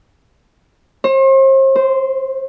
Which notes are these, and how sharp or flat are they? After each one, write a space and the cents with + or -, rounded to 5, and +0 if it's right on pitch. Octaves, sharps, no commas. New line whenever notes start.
C5 +40
C5 -10